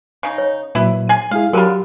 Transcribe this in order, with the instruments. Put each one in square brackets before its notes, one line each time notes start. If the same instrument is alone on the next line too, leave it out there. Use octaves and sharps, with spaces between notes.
[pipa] C#3 D#4
[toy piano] C#5
[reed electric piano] A#2 F#3 [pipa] E4 B4
[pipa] G#4 G#5
[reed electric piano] G#3 E4 G#4 [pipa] F5
[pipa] D3 F4 [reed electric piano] F#3 G4 [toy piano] A#4 A5 B5